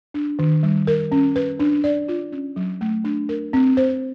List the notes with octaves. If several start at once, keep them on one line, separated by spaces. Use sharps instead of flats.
D4
D#3
G3
A#4
C#4
B4
D4
D5
F4
C#4
F#3
A3
D4
A#4
C4
C5